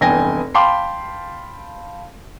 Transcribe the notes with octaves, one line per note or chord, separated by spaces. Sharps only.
F1 E2 G2 G5 G#5 A#6
F5 G5 A5 B5 C6 D6